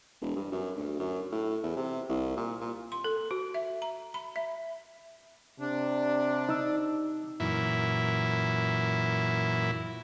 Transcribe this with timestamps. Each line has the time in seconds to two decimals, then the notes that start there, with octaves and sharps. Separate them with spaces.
0.21 E1
0.36 G2
0.52 F#2
0.76 D2
1.00 F#2
1.32 A2
1.63 E2
1.76 C3
2.09 C2
2.37 A#2
2.61 A#2
2.92 C6
3.04 A4
3.31 F#4
3.54 E5
3.82 A#5
4.14 B5
4.36 E5
5.60 C3 D4
6.49 D#4 E6
7.40 F#2 A#2 E3 E4